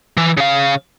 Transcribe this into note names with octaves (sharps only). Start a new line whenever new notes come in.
E3
C#3 F5